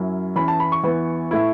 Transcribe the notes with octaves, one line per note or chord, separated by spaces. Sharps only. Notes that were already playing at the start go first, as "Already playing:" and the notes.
Already playing: F#2 F#3 C#4 E4
E2 E3 C#4 B5
A5
B5
C#6
E2 E3 B3 E4
A2 A3 E4